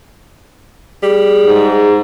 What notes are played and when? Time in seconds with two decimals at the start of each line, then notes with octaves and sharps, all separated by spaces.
1.03 G3 G#4
1.45 G#2